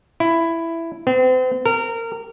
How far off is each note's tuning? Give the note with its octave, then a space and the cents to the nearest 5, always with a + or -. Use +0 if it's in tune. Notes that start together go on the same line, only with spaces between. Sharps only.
E4 +10
C4 -40
A#4 -25